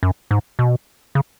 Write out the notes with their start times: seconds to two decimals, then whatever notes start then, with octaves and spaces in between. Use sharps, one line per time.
0.03 F#2
0.31 G#2
0.59 B2
1.15 C#3